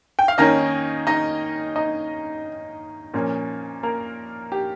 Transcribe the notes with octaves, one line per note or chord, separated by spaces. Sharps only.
G5
F5
D#3 A#3 C#4 D#4 D#5
D#4 D#5
D#4 D#5
A#2 F3 A#3 C#4
A#3 A#4
G4